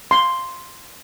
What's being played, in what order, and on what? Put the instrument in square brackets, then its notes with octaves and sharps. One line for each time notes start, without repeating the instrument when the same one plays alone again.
[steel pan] C6